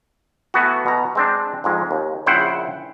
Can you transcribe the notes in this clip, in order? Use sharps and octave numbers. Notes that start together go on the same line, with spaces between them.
E3 A3 B3 F#4
B2 A#5
G#3 C4 D4
F2 G#2 G#3
D#2
A#1 C#3 E4 C5 F#5 G5